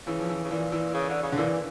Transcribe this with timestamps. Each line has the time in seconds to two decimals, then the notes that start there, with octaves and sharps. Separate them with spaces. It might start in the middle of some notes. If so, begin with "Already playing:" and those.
0.07 C#3 E3
0.20 F3
0.29 E3
0.44 C#3
0.51 A#2 E3
0.72 E3
0.94 C#3
1.09 D3
1.23 C#3
1.32 D3
1.38 A#2 E3